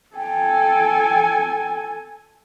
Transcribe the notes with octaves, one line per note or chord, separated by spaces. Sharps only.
A4 G5 G#5